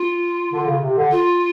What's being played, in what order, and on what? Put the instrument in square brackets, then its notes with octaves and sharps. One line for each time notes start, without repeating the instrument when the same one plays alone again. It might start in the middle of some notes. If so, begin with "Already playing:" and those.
Already playing: [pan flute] F4
[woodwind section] D3
C#3
C3
D3
[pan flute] F4